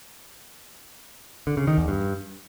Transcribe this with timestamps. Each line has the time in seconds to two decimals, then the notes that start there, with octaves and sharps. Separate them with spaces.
1.47 D3
1.57 C#3
1.67 D#3
1.78 E2
1.88 G2